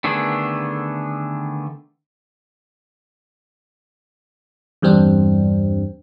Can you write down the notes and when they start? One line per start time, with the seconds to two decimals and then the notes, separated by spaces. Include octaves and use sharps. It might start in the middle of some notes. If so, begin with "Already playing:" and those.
0.04 D3 D#3 A3 B3 G#4
4.82 E2 G2 G3 C4 D4